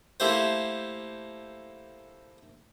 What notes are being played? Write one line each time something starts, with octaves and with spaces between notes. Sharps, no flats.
A3 A#3 E4 G4 C5